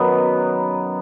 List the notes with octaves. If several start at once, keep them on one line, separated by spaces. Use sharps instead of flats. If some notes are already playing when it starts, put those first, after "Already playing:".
Already playing: F#2 D#3 F#3 B3